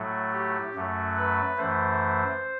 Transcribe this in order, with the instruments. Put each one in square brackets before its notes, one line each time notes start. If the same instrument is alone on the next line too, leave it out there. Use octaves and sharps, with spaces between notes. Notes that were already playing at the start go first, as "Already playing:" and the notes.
Already playing: [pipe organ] A2 F#3 A3
G4
F#2 F#3 A3
B4
F#2 E3 A3 C5